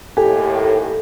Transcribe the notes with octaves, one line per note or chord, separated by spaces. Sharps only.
D#2 A2 G4 A4 G#5